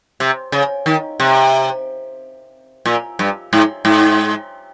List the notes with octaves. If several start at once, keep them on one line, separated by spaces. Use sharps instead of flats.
C3
C#3
D#3
C3
A#2
G2
G#2
G#2